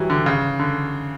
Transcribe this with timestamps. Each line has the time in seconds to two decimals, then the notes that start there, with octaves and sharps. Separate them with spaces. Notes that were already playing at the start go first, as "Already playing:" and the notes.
Already playing: E3 F#3 G3
0.10 D3
0.26 C#3
0.59 D3